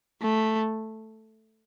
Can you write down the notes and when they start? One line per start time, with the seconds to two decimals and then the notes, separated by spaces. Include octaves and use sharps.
0.22 A3